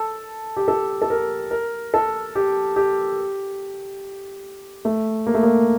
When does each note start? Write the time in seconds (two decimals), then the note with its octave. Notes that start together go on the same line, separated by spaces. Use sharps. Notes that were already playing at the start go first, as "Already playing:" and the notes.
Already playing: A4
0.56 G4
0.68 A4
1.02 A4
1.10 A#4
1.51 A#4
1.94 A4
2.35 G4
2.76 G4
4.85 A3
5.26 A#3
5.34 A3
5.43 A#3